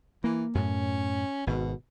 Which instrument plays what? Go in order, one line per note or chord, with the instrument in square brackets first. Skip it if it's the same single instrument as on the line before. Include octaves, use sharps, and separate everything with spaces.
[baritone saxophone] E3 [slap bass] A#3
[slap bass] F#2 A2 [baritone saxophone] C#4
[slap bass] G#1 [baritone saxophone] B2